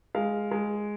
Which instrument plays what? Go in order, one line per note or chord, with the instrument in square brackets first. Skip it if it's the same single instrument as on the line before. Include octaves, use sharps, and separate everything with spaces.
[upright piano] G#3 F5
G#3